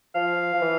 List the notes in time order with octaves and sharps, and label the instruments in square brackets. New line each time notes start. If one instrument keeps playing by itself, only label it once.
[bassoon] F3 [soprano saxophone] F5
[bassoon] F3
E3